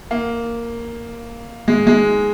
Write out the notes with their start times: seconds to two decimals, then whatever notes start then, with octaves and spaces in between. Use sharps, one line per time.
0.11 A#3
1.68 G#3
1.87 G#3